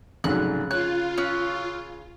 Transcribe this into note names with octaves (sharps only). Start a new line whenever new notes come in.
F1 G#2 C#3 F#3 F#6
F4 C#5 F#6
C#4 E6 F#6